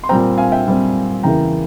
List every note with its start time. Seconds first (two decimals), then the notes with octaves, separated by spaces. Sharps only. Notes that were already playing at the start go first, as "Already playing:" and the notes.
0.04 C6
0.09 A#2 G3 C4 G5 A#5
0.37 F5 G#5
0.52 E5 G5
0.66 A#2 G3 C4
1.23 E2 C#3 E3 A#3 E4 G5 A#5